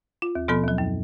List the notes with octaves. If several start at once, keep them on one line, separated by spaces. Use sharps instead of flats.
F4
D#2
B2 F3 B3 A4 B5
D#2 F#3
F#2